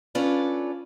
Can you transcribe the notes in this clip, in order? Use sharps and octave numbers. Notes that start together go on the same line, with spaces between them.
C#4 D4 F4 A4 B4 D5